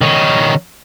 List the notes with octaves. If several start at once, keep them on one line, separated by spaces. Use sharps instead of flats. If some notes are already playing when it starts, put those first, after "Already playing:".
D#3 C#4